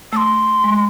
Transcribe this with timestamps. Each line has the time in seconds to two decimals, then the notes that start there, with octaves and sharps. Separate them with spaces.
0.12 A3 C6 E6
0.64 G#3